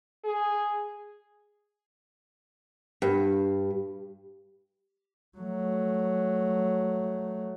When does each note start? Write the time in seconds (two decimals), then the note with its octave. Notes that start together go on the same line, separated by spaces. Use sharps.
0.25 G#4
3.02 G2
5.38 F#3 A3